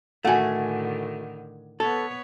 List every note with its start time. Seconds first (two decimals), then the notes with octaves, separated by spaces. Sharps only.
0.25 A2 D3 D#3 A3 F#4 F#5 G#5
1.80 B3 A4 B4 C#5